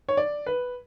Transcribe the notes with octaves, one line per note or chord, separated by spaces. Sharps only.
C#5
D5
B4